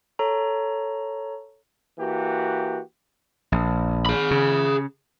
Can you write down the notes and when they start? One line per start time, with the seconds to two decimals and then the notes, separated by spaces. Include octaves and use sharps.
0.19 A4 C#5 A#5
1.99 E3 A#3 F#4 G4
3.52 A#1
4.06 G#4 B5
4.31 C#3